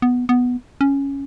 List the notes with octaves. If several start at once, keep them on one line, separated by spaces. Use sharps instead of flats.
B3
B3
C#4